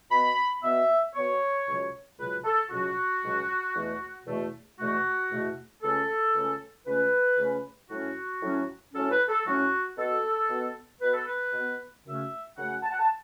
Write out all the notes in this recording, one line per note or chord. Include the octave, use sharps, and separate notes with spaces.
B2 B3 B5
B2 B3 E5
B2 B3 C#5
C#2 B2 F#3
C#2 B2 F#3 B4
A4
C#2 B2 F#3 F#4
C#2 B2 F#3
E2 B2 A3
E2 B2 A3
E2 B2 A3 F#4
E2 B2 A3
C#2 C#3 A3 C#4 A4
C#2 C#3 A3 C#4
C#2 C#3 A3 C#4 B4
C#2 C#3 A3 C#4
A2 F#3 C#4 F#4
A2 F#3 C#4
A2 F#3 C#4 A4
B4
A4
A2 F#3 C#4 F#4
B2 B3 A4
B2 B3
B2 B3 B4
A4
B4
B2 B3
F#2 C#3 A3 C#4 E5
F#2 C#3 A3 C#4 F#5
A5
F#5
A5